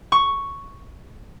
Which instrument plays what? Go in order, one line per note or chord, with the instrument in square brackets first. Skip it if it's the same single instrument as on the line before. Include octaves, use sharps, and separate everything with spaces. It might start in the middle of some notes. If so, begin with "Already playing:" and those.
[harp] C#6